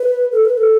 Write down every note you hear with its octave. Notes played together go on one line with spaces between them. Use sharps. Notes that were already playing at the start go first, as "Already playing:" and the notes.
Already playing: B4
A4
B4
A4